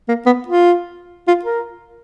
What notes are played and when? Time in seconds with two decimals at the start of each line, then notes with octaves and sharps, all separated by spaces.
0.08 A#3
0.26 B3
0.48 F4
1.28 F4
1.44 A#4